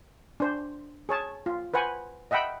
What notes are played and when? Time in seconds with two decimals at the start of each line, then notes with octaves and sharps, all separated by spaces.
0.40 D4 C5
1.09 G#4 C#5 A5
1.46 F4
1.74 B4 C5 F#5 G#5
2.31 D#5 E5 F#5 G5 B5